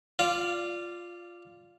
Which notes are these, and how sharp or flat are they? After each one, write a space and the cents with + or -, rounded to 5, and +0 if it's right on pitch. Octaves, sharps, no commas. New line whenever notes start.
F4 +0 D5 +0 F5 -25